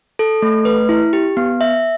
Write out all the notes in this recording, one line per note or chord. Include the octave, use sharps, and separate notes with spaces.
A4
A3
B4
E4
G4
B3
E5